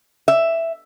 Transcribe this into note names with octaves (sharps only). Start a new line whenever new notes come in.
E5